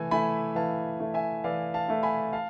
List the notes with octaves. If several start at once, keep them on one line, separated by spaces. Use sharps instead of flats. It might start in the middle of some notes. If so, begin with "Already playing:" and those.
Already playing: E3 A3 G#5
A3 E4 G#5 B5
E3 F5 A5
A3 E4
E5 G#5
E3 D5 F5
F5 A5
A3 E4
G#5 B5
F5 A5